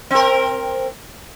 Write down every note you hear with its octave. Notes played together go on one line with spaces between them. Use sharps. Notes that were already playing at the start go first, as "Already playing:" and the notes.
C4 A#4